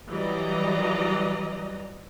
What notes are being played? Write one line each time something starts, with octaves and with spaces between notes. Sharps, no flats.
E3 F#3 G3 D5 D#5 A#5